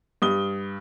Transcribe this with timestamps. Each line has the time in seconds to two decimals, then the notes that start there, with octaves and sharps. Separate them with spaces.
0.22 G2 D#6 G7